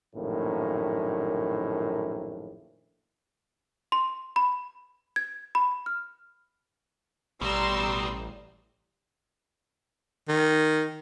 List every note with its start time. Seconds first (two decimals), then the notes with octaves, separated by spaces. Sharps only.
0.15 A#1 F#2 A2 D#3 A#3
3.92 C6
4.36 B5
5.16 G#6
5.55 B5
5.86 F6
7.41 A1 B2 G3 A#5 C6 E6
10.28 D#3